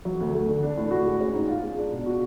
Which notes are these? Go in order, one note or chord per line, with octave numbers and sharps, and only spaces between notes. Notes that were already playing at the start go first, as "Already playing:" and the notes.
F#3
D2
A3
D3
D4
A2
F#4
G#3
C#4
G#2
F4
G#3
D4
B2
F#4